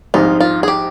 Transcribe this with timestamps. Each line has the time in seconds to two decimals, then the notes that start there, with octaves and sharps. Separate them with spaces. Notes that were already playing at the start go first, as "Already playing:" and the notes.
0.14 A#1 G#2 G3 C4 D#4 F4
0.40 F4
0.63 G#4
0.68 G4